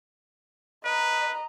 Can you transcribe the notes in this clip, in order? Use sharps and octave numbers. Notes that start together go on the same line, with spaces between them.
B4 D#5 A#5